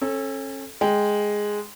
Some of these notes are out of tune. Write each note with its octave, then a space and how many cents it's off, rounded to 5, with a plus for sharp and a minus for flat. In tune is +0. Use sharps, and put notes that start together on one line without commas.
C#4 -35 A4 -5
G#3 +0 G5 +0